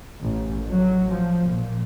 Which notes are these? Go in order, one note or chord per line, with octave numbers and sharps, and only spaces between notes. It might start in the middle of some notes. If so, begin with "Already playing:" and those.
A1
F#3
F3
A#2